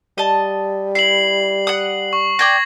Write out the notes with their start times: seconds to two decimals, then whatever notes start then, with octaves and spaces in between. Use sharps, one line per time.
0.18 G3 D#5 A5
0.95 E4 C7 F#7
1.67 F#5 D#6
2.13 C#6
2.39 D5 G5 D6 G#6 A#6